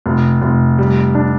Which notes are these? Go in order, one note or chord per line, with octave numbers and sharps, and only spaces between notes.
F1
F1
G3
D4